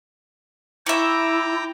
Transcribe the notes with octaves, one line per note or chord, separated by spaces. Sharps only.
E4 E5 G5 A#5 C#6 D6